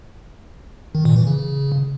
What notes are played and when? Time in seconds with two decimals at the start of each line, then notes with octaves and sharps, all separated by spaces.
0.95 D#3
1.05 A#2
1.16 E3
1.27 C#3